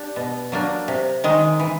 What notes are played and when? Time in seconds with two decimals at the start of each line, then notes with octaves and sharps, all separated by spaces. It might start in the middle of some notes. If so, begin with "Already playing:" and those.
Already playing: D4 G4
0.16 B2
0.52 F#3 A#3 D4
0.88 C3
1.24 D#3 G#3
1.59 E3